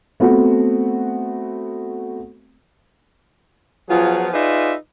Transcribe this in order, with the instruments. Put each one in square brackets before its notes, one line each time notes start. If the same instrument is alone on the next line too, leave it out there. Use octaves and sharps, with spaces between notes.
[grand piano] A3 B3 C4 F#4
[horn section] F3 F#3 B3 F4 G#4
D#4 F4 G#4 B4 D5 E5